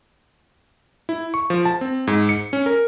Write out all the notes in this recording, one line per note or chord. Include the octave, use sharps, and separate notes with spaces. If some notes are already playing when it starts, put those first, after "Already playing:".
E4
C#6
F3
A5
C4
G#2
C#7
C#4
A#4